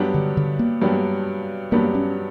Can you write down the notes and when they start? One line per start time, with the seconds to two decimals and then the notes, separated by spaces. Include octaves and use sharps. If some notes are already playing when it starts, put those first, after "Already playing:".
Already playing: G2 F#3 B3 D4 G4
0.14 D3
0.37 D3
0.59 A#3
0.82 G2 F#3 B3 D4 G4
1.71 G2 F#3 A#3 B3 D4 G4
1.95 C#4